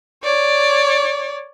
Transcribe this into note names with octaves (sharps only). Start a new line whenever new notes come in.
C#5 D5